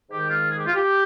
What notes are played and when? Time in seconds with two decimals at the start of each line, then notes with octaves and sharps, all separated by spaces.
0.10 G#2 D#3 G#3 G4
0.29 F4
0.49 G#4
0.58 G4
0.67 F4
0.75 G4